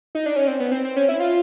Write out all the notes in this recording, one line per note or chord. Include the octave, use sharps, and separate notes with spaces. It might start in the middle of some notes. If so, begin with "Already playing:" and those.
D#4
D4
C#4
C4
B3
C4
C4
C#4
E4
F4